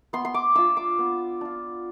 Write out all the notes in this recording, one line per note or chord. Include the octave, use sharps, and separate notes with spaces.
B3 C6
C6
D6
D4 F4 E6
D6
B3
D4 F4